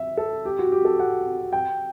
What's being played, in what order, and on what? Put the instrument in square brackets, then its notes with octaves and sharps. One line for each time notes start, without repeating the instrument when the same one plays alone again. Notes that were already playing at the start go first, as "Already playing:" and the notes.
Already playing: [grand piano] E5
A4
G4
F#4
G4
A4
F#5
G5